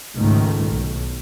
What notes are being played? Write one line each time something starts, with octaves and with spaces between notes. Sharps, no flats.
C#2 G#2 D#3 A3
B1